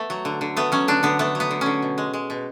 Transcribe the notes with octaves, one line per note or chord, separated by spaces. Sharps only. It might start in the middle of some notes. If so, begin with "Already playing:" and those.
Already playing: A3 B3
F#3
D3
D3
A3 B3
F#3 C#4
D3 D4
D3 B3
A3 B3
F#3
B3
D3
D3 C#4
B2
G#3
G#3
B2